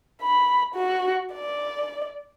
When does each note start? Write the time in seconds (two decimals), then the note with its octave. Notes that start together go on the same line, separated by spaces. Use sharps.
0.22 B5
0.75 F#4
1.33 D5